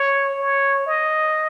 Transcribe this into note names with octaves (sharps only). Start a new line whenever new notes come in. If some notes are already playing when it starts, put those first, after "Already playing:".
Already playing: C#5
C#5
D#5